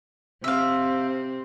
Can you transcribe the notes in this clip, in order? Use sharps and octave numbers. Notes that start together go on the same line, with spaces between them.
C3 C4 E5 F5